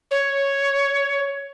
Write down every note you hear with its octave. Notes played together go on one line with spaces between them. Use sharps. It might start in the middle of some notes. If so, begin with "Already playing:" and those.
C#5